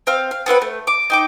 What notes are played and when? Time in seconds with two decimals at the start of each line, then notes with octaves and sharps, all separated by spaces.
0.07 C4 F5 F6
0.31 F5
0.46 B3 C4 B4 F#5
0.62 A3
0.87 D6
1.10 D#4 G5 D6